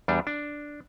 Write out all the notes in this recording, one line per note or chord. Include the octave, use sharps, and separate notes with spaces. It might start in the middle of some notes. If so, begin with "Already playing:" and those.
E2 G3 D4
D4